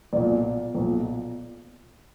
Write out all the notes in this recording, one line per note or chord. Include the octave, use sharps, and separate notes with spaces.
B1 A#2 D5
B1 A#2